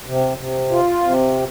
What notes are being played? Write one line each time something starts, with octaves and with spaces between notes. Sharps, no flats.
C3
C3
F4
C3